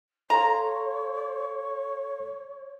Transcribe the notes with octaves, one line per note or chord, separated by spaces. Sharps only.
A4 C#5 F5 A#5 C6